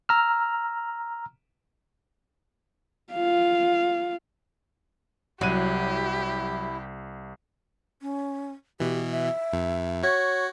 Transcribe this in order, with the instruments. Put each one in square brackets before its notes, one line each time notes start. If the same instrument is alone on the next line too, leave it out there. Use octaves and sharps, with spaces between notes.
[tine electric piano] A#5 E6 F6
[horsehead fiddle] F4 F5
[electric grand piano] C2 D#7 [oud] F#3 [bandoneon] E4 [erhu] G4
[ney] C#4
[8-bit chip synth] B2 E3 [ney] G4
[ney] E5
[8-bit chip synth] F2
[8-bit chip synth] F#4 [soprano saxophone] C#5